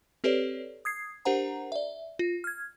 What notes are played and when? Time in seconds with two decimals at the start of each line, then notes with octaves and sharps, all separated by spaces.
0.24 C4 G4 A4 B4 C#5 D5
0.85 D#6 G#6 C7
1.25 D4 G4 A#4 C5 F#5 A#5
1.72 D5 E5
2.19 F4
2.44 F6 G#6